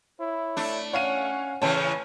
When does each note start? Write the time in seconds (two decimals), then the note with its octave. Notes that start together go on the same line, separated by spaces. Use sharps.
0.20 E4 C#5
0.57 A3 D4
0.93 C#4 C#5 F5 F#5 D#7
1.62 A2 C#3 E3 C#4 C#5 A5